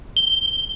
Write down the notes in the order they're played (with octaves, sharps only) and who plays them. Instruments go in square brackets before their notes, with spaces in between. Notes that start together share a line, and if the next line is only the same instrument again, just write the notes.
[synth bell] G7